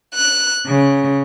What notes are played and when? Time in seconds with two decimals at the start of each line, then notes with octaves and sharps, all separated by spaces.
0.15 F#6
0.67 C#3